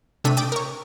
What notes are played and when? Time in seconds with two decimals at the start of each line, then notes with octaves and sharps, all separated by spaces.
0.24 C3 A3 D4 E5 B6 D#7
0.37 D5 G5 D6 D#6
0.52 A#4 C#5